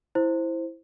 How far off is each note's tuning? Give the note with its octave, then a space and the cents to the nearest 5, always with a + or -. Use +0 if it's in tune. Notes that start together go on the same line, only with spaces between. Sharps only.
E4 +0 C5 +0